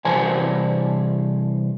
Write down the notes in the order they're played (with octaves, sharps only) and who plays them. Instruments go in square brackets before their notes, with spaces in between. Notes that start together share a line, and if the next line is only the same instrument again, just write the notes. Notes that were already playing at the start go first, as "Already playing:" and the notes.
[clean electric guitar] C2 E3 C5 D5 G#5 A5